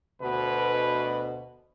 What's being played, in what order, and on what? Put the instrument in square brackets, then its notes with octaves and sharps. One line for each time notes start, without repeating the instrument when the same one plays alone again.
[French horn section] D2 B2 [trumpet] B4